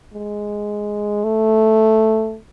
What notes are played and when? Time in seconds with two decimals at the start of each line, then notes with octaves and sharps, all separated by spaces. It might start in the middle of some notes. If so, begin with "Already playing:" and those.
0.14 G#3
1.24 A3